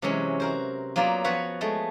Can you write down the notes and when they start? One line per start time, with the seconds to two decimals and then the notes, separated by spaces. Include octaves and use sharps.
0.02 C3 E3 F#3 G#3 C#4
0.40 F#4 A#4 C5
0.96 F#3 A#3 B3 F4 D5
1.24 F3 B3 F#4 B4 C#5 F5
1.61 G#3 A3